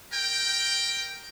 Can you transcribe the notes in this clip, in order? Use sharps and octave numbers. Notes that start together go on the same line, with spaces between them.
A#4 G5